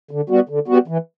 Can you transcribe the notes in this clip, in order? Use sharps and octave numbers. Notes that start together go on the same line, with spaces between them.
D3
G3 B3 F#4
D3
G3 B3 F#4
E3